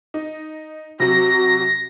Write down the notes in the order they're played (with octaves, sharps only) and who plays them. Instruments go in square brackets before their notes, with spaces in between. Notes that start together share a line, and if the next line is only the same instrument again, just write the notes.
[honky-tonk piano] D#4
[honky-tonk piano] C3 F#3 [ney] F#4 [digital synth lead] A#6